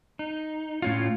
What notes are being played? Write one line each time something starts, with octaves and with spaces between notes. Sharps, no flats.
D#4
A2 C#4 F4